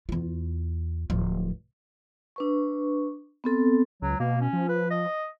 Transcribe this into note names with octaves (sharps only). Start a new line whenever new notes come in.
E2 F4
D1 F3
D4 B4 C#6
B3 C4 A4
C#2 F#3
B2 A#3
C#4
F3
B4
D#5